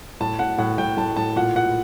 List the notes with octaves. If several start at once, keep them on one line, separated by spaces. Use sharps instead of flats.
A2 A5
A2 F#5
A2 F#5
A2 G5
A2 A5
A2 A5
A#2 F#5
A#2 F#5